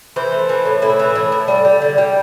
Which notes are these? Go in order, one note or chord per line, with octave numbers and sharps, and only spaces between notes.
E3 C5
A3
E3
A2
A2 E4
E3
A2
A2
G3
G3
D3
G3